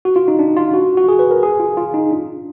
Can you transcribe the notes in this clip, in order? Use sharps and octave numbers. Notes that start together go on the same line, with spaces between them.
F#4
F4
D#4
D4
F4
F#4
F#4
G#4
B4
A#4
G#4
F4
F4
D#4
D4